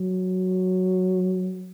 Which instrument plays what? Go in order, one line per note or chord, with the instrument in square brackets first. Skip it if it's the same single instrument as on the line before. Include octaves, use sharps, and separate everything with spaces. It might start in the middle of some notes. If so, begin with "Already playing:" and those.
Already playing: [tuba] F#3